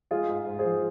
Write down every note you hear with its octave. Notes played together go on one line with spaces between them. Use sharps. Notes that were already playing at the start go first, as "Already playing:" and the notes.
G#3 F4 G#4
G#2
G#2
G#4 C5
F3